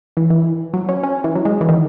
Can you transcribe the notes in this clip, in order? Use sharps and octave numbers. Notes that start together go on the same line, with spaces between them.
E3
E3
F#3
C#4
C#4
E3
F#3
G#3
E3
D#3